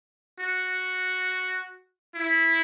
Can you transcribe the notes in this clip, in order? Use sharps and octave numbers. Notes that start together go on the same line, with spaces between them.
F#4
E4